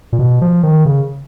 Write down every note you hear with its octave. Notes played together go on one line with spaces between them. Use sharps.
A#2
B2
F3
D#3
C#3